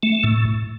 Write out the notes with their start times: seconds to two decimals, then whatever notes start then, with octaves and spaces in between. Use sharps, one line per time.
0.03 A3
0.24 A2